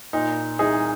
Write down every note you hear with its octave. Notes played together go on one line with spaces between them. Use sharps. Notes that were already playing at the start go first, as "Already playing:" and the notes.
A#2 D#4
C2 D#4 G#4